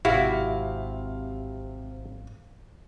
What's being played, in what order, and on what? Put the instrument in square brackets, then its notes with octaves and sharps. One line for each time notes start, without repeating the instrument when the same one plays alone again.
[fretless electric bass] G#1 [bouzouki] C3 [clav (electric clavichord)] E4 F#4 [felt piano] F5